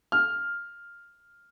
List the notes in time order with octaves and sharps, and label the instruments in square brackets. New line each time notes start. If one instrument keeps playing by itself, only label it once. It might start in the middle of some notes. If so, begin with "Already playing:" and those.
[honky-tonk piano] F6